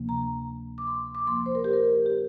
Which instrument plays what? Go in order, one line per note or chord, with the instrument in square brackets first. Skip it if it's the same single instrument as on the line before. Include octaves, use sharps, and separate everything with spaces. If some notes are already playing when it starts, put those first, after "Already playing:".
Already playing: [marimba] D2 C3 F3 A#3
A#5
D6
C6
D6
F2 F3 A#3 C6
C5
A#4
G4
A#4
G4